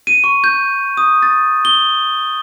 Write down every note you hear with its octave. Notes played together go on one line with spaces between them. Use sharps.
D#7
C#6
G6
D#6
A6
G7